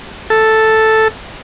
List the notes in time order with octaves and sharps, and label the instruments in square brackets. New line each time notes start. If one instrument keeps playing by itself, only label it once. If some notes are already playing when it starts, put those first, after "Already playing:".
[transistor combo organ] A4